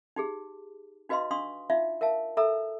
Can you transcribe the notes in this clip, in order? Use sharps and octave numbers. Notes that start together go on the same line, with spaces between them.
D#4 G4 G#4
D#4 F#4 B4 D#5 F5 C6
D4 F5 C6 C#6 D#6
D#4 F4 E5 F5
A#4 E5 F5 A5
A4 E5 A#5 E6